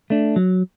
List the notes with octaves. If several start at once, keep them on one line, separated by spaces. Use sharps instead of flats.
A3 D4
F#3